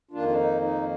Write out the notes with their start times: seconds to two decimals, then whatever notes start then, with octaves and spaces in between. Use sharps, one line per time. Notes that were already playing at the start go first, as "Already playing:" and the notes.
0.11 F2 D#3 A#3 D4 F4
0.28 D4
0.36 D#4
0.62 D#4